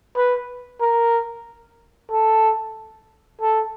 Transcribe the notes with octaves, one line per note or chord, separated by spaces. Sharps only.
B4
A#4
A4
A4